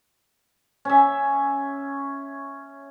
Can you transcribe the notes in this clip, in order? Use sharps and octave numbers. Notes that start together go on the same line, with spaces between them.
C#4 E5